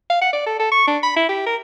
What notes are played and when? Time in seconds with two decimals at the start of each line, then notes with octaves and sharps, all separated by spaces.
0.10 F5
0.21 F#5
0.33 D5
0.46 A4
0.59 A4
0.72 C#6
0.87 D4
1.03 B5
1.16 E4
1.29 G4
1.47 A#4